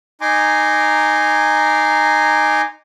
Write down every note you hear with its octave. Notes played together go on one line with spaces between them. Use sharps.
D#4 G#5 A#5 C6 D6